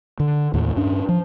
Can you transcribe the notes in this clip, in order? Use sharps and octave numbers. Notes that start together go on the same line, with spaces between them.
D3
D#2 A2
G2 C#4 D4
F3